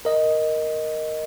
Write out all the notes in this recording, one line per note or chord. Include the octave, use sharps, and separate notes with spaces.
A#4 D#5